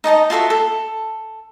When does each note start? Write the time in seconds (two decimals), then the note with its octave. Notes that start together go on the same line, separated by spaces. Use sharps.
0.04 D#4 D#5 A5 A#5
0.30 F4 F#4 A4 E5
0.50 A4